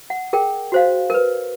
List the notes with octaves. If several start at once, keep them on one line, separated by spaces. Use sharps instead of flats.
F#5
G#4 A#4 G5
F#4 C5 F5
A#4 B4